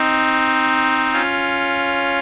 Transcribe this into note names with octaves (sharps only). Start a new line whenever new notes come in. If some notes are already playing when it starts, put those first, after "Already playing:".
Already playing: C4 D#4
C#4 F4